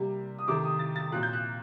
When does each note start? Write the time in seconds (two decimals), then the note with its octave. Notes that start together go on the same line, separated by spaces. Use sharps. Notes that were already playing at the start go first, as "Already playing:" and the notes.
Already playing: C3 G3 A#3
0.39 D#6
0.48 C3 D#3 A3 C4 D6
0.64 D#6
0.79 A6
0.96 A6
1.12 A#2 F#3 C4 F#6
1.23 G6
1.33 F#6